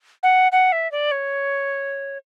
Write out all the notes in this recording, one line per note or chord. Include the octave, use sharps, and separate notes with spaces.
F#5
F#5
E5
D5
C#5